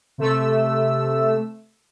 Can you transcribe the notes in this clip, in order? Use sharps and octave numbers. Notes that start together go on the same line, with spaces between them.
C3 A3 E6